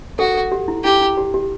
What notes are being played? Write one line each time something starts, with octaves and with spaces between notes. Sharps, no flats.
F#4 A4
A4
G4
E4
E4 G4
E4
G4
G4